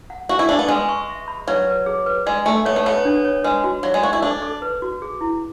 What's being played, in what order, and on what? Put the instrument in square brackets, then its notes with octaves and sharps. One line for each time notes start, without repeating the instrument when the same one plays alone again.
[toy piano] F#5
[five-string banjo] F#4 [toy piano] G#5
[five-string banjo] E4
[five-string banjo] D4 [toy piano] C#6
[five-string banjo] B3
[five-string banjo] G#3 [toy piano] B4
[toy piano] C#6
E5
B5
[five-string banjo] F#3 [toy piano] B4
[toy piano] B4
G#4
B4
[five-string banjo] G#3 [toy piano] D5
[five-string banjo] A3 [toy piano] G#5
[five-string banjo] B3 [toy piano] C#5
[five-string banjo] A3
[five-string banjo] B3 [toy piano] C#5
[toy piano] D4
C#5
[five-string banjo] G#3 [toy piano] B4
[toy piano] F#4
[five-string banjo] F#3 [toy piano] D5
[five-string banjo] G#3
[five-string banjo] F#4 [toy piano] D5
[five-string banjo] E4
[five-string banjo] D4 [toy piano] A4
[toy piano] A4
B4
F#4
G#4
E4